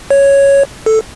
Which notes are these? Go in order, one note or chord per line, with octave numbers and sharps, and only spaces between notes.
C#5
A4